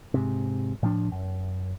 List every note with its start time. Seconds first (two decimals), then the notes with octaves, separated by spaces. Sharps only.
0.14 G#2 C3
0.83 A2 F3 D4
1.12 F#2